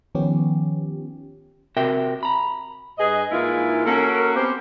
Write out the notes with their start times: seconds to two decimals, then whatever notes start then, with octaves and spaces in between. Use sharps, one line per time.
0.15 D#3 F3 B3 C#4 G4
1.77 C3 F#4 A#4 E5 G5
2.23 A#5 B5
2.98 G2 G#4 B4 D#5
3.31 G#2 E3 G#3 A#3 E4 F4
3.85 A#3 C#4 F#4 A4 A#4
4.36 B3 C4 G4 C5